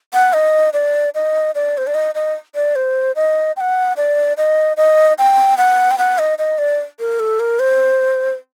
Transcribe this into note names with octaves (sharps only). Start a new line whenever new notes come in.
F#5
D#5
D5
D#5
D5
C5
D5
D#5
D#5
D5
C5
D#5
G5
F#5
D5
D#5
D#5
G5
F#5
G5
F#5
D#5
D#5
D5
A#4
A4
A#4
C5